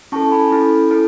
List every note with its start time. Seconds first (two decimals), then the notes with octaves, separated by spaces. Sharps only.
0.12 C#4 E4 A4 A5 C#6
0.32 G#5 B5
0.51 C#4 E4 A4
0.90 C#4 E4 A4